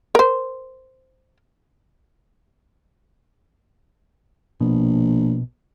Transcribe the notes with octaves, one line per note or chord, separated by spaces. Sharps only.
A#4 C5
A#1 B2